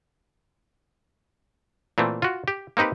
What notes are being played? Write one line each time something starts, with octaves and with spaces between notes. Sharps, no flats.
A#2 E3 A3 C4
F4 F#4
G4
A#3 C4 D#4 G4 B4